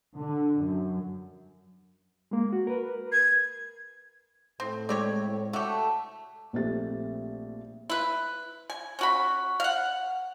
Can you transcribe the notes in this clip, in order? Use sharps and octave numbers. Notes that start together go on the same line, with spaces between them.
D3
F#2
G#3 A#3
F#4
A#4 B4
G#6
A2 C4
G#3 C4 G4 C#5 D5
A3 F#4 G4
A#1 A3 C4 G4 E5 A6
E4 B4
G#5
C#4 F#4 B5
F5 F#5